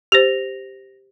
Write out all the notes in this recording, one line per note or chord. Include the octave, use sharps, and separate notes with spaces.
G4 C5 A#6 F7